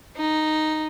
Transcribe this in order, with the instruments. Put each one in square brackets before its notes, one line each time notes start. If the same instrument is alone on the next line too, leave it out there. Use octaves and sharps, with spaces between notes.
[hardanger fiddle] D#4